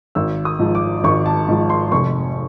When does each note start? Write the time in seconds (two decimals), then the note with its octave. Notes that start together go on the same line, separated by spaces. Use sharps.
0.15 G#1 E6
0.45 D#6
0.59 G#2 F3
0.75 D6
1.04 G#1 C#6
1.26 A5
1.48 G#2 F3
1.70 C6
1.92 F1 C#6